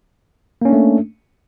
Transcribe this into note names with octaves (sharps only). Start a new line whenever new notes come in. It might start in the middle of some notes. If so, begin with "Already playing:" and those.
A3 A#3 C#4 D4